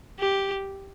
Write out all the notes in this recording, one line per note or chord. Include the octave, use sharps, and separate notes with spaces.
G4